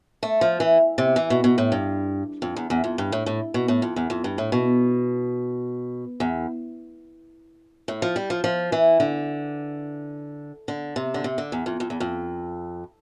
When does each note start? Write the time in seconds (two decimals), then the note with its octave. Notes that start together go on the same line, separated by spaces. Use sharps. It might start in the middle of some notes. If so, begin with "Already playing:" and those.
0.23 A3
0.41 F3
0.60 E3
0.98 C3
1.16 E3
1.30 B2
1.44 B2
1.58 A2
1.72 G2
2.42 F2
2.56 E2
2.70 E2
2.84 F2
2.98 G2
3.12 A2
3.26 A2
3.54 B2
3.68 A2
3.82 F2
3.96 E2
4.10 F2
4.24 G2
4.38 A2
4.52 B2
6.20 E2
7.88 A2
8.02 F3
8.16 G3
8.30 F3
8.44 F3
8.72 E3
9.00 D3
10.68 D3
10.96 C3
11.14 D3
11.24 C3
11.38 D3
11.52 E2
11.66 F2
11.80 F2
11.90 E2
12.00 F2